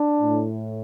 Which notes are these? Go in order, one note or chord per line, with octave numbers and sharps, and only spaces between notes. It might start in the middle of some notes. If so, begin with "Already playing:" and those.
Already playing: D4
A2